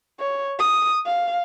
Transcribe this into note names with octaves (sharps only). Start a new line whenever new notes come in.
C#5
D#6
F5